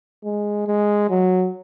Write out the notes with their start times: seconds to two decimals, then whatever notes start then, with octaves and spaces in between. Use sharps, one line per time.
0.24 G#3
0.67 G#3
1.10 F#3